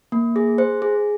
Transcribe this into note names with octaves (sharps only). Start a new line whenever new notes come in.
A#3
G#4
C5
G#4